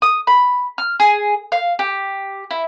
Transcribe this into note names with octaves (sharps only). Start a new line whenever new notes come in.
D#6
B5
F6
G#4
F5
G4
E4